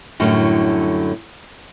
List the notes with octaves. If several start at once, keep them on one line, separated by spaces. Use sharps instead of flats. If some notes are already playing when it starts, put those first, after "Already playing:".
F#2 A2 D3 F#3 G3